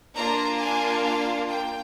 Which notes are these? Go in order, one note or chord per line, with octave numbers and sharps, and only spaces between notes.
A#3 D4 F4 A#5
G#5
F5
G5